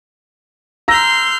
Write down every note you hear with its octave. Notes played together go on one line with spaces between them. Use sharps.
A#5 C6 E6 F6 G6 A#6